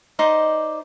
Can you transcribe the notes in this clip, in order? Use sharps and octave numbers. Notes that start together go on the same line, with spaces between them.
D#4 C5 D5 D#5